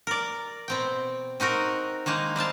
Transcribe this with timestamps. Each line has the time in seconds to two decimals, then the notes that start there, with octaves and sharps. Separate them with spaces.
0.07 A#4 D5
0.68 B2 C4 G5
1.40 C4 D#4 F#4 A#4
2.06 D#3 G#3 A#3 D#4
2.36 G3 C4 F5 A5